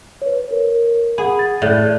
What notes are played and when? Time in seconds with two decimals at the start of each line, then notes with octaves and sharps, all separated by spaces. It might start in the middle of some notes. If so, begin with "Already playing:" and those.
0.22 B4 C#5
0.51 A#4
1.18 G#4 F#5 B5
1.39 A6
1.62 A2 D5 F#6